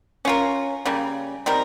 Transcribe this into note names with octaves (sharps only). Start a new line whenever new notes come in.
C#4 F4 A#4
C#3 G3 A#3
G3 C4 D#4 A#4